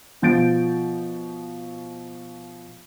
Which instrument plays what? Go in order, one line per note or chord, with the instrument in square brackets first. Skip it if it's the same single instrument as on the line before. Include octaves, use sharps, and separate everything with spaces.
[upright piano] B2 F3 G6 A6 D7